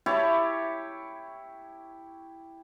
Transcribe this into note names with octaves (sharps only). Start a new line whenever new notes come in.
E4 G4 C#5 A5